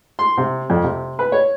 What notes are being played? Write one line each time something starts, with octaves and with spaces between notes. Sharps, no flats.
C6
C3
F2
C3
B4
C#5